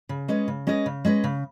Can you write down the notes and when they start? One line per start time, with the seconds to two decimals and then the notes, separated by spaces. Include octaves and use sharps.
0.09 C#3
0.28 G#3 C#4 B4 D#5
0.48 C#3
0.67 G#3 C#4 B4 D#5
0.86 C#3
1.05 G#3 C#4 B4 D#5
1.24 C#3